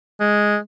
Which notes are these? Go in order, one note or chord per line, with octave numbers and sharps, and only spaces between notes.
G#3